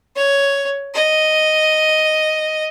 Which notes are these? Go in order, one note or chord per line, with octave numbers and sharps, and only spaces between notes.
C#5
D#5